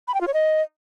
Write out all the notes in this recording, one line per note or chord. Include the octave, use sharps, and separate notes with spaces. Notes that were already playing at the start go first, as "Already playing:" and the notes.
B5
G5
F4
C#5
D#5